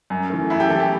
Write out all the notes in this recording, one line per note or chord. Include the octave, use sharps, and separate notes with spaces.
F#2
E3 A3
F#2 E4
G4
E3 A3 A4
G4